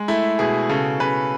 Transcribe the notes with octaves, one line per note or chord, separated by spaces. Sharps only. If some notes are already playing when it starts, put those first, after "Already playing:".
Already playing: G#3
A3 E4
B2 G#4
C#3 A4
C#3 B4